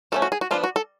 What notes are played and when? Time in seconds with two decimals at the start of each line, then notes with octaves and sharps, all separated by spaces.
0.12 F3 A3 C#4 A4
0.22 F#4
0.32 G#4
0.41 F#4
0.51 F3 B3 D4 F4
0.64 F#4
0.76 A4